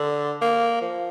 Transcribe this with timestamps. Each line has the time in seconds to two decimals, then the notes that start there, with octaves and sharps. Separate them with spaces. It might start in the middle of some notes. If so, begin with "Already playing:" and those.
Already playing: D3
0.41 A#3
0.81 F3